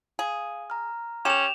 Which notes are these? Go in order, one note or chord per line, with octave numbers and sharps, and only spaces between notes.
G#4 F5
A#5 F6
C#4 G4 E7 F7